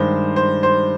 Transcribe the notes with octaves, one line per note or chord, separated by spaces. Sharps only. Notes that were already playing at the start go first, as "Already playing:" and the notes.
Already playing: G2 D#3 G#3 C5
C5
C5